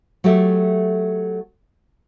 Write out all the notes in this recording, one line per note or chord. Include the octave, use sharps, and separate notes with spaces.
F#3 A3 G4 A4 E5